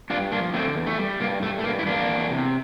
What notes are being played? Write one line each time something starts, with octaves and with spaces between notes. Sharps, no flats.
G2 D4 F4
F3 A#3 D4
D3 A3 C4
E2
A3
G3
G2 A#3
G2 A3
A3
G2 A#3
E4
E2 A#3 D4
E2
C3